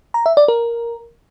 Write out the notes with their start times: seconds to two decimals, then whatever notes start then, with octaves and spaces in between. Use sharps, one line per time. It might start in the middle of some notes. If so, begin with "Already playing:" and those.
0.14 A#5
0.26 E5
0.37 D5
0.48 A#4